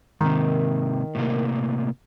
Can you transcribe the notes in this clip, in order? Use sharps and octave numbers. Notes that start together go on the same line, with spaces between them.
G#2 C3 D#3
A2 C3 A#3